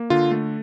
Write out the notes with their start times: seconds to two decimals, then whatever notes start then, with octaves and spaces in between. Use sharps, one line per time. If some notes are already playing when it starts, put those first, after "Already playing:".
Already playing: A#3
0.10 D3 F4
0.31 A3